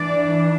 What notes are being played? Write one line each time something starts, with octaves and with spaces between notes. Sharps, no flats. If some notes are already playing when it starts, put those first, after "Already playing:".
Already playing: E3 D4 D5